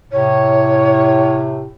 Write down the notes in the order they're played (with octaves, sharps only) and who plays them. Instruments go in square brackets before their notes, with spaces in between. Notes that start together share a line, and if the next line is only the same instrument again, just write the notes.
[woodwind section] A2 C3 [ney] C#5